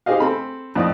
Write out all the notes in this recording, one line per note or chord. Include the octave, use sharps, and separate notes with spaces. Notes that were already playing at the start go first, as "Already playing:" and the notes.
D#4 G4 G#4 C5 D#5 F5
C4 A4 B5
F2 A2 D5 D#5 D#6